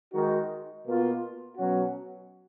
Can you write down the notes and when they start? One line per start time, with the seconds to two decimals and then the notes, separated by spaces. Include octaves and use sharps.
0.12 D#3 G#3 D#4 F#4
0.85 B2 A#3 F4
1.56 B2 F#3 C#4 F#4